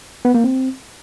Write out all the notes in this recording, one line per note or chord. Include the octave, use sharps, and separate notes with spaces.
B3
A#3
C4